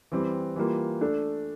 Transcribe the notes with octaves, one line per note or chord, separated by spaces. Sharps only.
E3 G3 C4
E3 G3 A#3 F4
A3 D4 A4